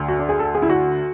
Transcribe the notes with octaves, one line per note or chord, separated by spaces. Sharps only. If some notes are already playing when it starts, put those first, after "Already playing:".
Already playing: D2 D3
F#4
D4
G#4
A4
G#4
E4
F#4